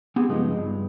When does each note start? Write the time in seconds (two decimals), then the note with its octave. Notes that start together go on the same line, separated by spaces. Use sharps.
0.16 B3 C4 G4 G#4
0.28 G2 C#3 F3 G#3 B3 D#4
0.58 G2